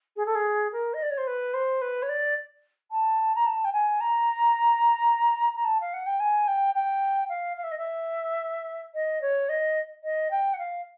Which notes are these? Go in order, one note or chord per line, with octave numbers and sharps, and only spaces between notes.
G#4
A4
G#4
A#4
D#5
D5
C#5
C5
B4
C5
B4
C#5
D5
A5
A#5
A5
G5
G#5
A#5
A#5
A5
F5
F#5
G5
G#5
G5
G5
F5
F5
E5
D#5
E5
D#5
C#5
D#5
D#5
G5
F#5
F5